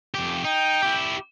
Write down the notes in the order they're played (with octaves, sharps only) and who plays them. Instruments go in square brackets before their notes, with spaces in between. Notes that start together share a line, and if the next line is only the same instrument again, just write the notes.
[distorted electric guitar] F2 G4
[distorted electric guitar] D#4 [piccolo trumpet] G5
[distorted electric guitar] E4 G4